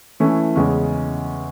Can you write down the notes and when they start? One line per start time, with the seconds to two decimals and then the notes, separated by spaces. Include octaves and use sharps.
0.20 E3 A3 C#4 E4
0.56 E2 C#3 G#3 C#4